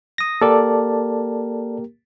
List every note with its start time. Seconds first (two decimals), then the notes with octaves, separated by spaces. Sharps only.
0.18 D#6 A#6
0.41 A#3 G4 A4 A#4 D5 A5